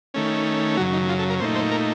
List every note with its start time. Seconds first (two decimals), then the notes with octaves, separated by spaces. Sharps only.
0.14 D#3 A3 C#4
0.77 F#2 C#3 F#3 F#4
0.93 D#4
1.09 F4
1.19 A4
1.30 A#4
1.40 A#2 A3 D#4 C5
1.55 C5
1.71 A#4